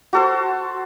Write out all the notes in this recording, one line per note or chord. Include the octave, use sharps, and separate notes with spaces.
F#4 A4 C5